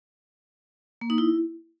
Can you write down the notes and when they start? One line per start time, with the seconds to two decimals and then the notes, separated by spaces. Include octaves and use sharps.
1.01 A#3
1.10 D#4
1.18 E4